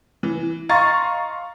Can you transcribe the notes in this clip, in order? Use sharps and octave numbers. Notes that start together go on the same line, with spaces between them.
E3
D#5 F5 A#5 C6 C#6 A6